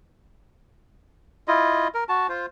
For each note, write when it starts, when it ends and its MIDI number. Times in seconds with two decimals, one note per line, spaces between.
1.48 1.88 64
1.48 1.88 65
1.48 1.88 75
1.94 2.04 70
2.09 2.27 66
2.09 2.27 81
2.29 2.46 65
2.29 2.46 72